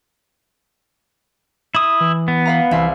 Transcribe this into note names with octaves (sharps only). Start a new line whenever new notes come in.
E4 D#6
E3
B3
B4 F5 A#5
C2 E3 E5 C6